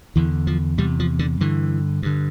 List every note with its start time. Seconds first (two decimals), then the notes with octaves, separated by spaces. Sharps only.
0.16 E2 D3 E3
0.47 F3
0.78 E2 C3 G3
1.00 F3
1.19 D3
1.40 G2 D3 E3
2.02 G2 D3